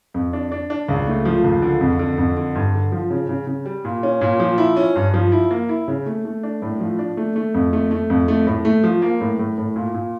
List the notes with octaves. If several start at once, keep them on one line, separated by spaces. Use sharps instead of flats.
F2
D4
D4
D4
C#2
A3
F3
C#2
D3
F2
D3
F2
D3
G2
D3
F3
C#3
C#3
C#3
G3
A#2
C#4
A#2
F3
E4
C#4
G2
F3
E4
A#3
E4
C#3
A3
A3
D4
A2
F3
D4
A3
A3
F2
A3
A3
F2
A3
A2
A3
F3
A#3
A2
A2
A2
A#2
A#2